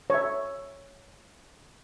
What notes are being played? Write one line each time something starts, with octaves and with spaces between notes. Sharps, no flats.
C#5 E5